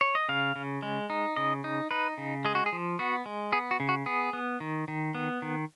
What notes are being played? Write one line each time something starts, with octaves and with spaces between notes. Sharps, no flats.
C#5
D#5
C#3 F5
C#3
G#3
D#4
C#3 D#5
D#4
D#4 B4
C#3
G#3 G#4
F#4
G#4
F3
B3 F#4
G#3
B3 G#4
F#4
C#3
F#4
B3 G#4
B3
D#3
D#3
B3
D#3